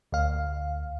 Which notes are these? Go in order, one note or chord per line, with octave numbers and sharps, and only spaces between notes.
D2 F5